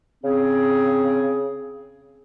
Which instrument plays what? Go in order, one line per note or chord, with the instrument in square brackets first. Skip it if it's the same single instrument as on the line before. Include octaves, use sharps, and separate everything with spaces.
[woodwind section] C#3 C4 G#4